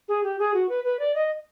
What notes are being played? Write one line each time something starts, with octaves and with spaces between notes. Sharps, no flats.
G#4
G4
G#4
F#4
B4
B4
D5
D#5